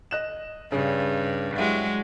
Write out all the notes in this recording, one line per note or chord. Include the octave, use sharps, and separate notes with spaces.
D#5 F#6 E7
G2 C#3
F#3 G#3 E4 G4